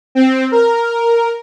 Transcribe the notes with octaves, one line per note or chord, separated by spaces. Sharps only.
C4
A#4